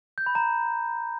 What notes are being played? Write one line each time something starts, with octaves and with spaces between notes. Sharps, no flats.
G6
B5
A#5